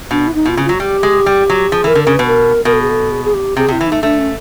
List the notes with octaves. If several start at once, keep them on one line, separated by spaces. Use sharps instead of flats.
B2 D4
E4
D#4
B2
F4
C#3
F#3 F4
F#4
G3 G4
G#3
G3
F#3
F3 G#4
E3
A#4
D3
C#3 A#4
B2 B4
A#4
B2 A#4
A4
G#4
A4
G#4
G#4
G4
C3 G#4
C3
E4
E3
A3 D#4
A3 D4
C#4